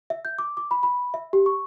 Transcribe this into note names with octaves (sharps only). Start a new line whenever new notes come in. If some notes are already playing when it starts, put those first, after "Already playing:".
E5
G6
D6
D6
B5
B5
E5
G4
C#6